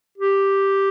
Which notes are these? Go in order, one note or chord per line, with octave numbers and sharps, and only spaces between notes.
G4